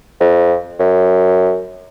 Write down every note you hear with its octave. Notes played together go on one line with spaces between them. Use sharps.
F2
F#2